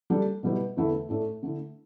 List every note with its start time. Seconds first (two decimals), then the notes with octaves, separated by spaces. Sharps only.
0.10 G3 D4 A4
0.43 B2 G3 E4 B4
0.76 E2 D3 A3 E4 A4
1.09 A2 A3 D4 A4
1.43 D3 A3 E4